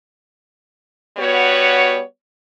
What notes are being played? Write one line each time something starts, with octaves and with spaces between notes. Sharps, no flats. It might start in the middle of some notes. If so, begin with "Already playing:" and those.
G3 B3 F#4 C#5